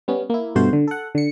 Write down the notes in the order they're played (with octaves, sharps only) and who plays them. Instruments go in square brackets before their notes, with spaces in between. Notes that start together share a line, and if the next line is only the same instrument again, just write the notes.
[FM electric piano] G3 B3 C#4
A#3 E4
G2 B2 A3 F#4 C5
D3
A4 F#5
D3 C#7